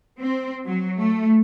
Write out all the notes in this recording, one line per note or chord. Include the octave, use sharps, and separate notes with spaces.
C4
F#3
A3